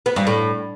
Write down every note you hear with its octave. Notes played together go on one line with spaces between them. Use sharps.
B3
G2
A2